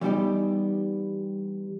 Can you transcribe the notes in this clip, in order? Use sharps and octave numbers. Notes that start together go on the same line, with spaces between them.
E3 G3 B3 D#4 G4 D5